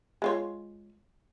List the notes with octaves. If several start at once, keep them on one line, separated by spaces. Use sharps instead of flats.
G#3 F4 C#5